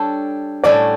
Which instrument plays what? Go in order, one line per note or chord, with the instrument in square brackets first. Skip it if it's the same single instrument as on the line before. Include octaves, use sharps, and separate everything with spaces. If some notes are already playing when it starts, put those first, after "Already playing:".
Already playing: [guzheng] G3 D4 A4 C#5
[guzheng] A2 G3 C#4 F#4 A4 [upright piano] D5